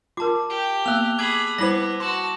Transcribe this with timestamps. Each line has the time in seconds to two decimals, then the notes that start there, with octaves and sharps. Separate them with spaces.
0.17 F4 A#4 A5 D6
0.50 G4
0.86 A#3 B3 E6 F#6 F7
1.18 G#4 B5 D6 G#6
1.58 G3 B3 E4 C5 A#6 F#7
2.00 F#4 A5 C6